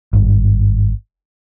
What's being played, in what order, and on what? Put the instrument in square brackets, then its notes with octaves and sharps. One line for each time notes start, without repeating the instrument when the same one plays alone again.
[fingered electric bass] G#1 G2